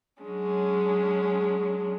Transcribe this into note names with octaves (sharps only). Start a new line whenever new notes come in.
F#3 G#3 C#4 D4